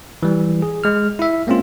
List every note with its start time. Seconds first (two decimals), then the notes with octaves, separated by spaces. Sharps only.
0.23 E3 G3
0.62 G#4
0.84 G#3 F6
1.19 E4 E5
1.47 G#3 A#3 C4 C#4 F4